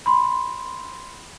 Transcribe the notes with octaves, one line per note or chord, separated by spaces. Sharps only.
B5 C6